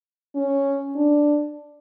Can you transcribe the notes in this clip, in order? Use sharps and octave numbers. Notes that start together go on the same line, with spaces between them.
C#4
D4